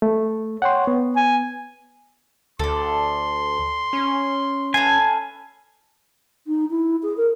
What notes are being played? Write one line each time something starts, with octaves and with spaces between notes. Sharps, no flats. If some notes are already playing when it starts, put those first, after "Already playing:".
A3
C#5 F#5 G5 C6
B3
G#5
D2 A4 D5 C6
C#4
A3 B4 F5 G#5
D#4
E4
G#4
A#4